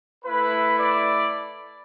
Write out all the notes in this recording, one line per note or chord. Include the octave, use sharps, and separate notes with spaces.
A3 E4 B4
D5